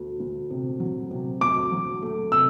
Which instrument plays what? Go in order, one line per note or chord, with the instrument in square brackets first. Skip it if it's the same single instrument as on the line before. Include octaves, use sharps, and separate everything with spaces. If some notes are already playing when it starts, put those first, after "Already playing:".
Already playing: [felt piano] D2 A3
D2
C3
F#3
C3
[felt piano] D2 [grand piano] D6
[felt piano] F#3
A3
[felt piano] C3 [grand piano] E6